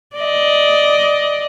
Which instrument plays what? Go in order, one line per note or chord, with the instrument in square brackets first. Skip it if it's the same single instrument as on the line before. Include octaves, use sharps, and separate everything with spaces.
[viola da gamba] D5 D#5